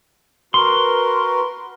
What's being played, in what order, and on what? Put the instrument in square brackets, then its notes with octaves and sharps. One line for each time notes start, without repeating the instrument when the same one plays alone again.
[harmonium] F#4 A#4 B4 [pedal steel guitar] C6